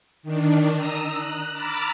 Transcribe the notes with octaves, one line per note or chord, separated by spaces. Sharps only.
D#3 D4
A#5 D#6 E6
F#6
A#5 B5 D6 E6 F6 A6